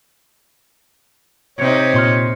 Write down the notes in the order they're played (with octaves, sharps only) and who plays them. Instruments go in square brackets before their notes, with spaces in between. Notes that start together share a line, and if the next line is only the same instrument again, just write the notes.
[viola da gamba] C3 D#4 [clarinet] C#5
[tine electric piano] A#2 C6 F6